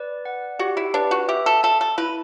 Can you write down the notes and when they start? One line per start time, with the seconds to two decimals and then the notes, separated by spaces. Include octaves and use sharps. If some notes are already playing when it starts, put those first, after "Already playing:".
Already playing: B4 D5
0.25 F#5
0.59 F#4 G4
0.77 E4
0.94 D4 B4
1.11 F#4
1.28 G4 E5
1.46 A4
1.63 A4 A5
1.81 A4
1.98 E4 B4